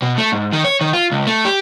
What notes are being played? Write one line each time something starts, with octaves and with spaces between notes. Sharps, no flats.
B2
A3
G#2
D#3
C#5
D#3
F4
C#2
A3
G4